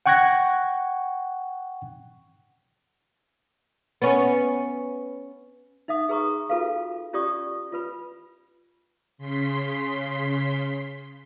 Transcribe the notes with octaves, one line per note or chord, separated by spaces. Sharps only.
F#5 G5 C#6 F#6 G#6 A#6
B3 C#4
D#4 E5 F#5 D#6
G#4 B4 A#5 C#6 D#6
F4 F#4 A4 B4 F5
C#4 F4 G4 D5 C#6 D#6
F4 B4 B5
C#3 C6 B6